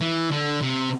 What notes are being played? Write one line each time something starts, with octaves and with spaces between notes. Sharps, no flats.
E3
D3
C3